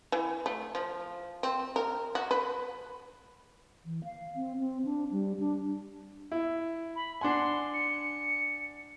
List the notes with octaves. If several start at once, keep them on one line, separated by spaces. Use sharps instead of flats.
E3
A3
F3
C4
A#4
F#4
B4
E3
F5
C4
C4
D4
G3
D4
E4
B5
D4 F#5 G#5 C6
C#7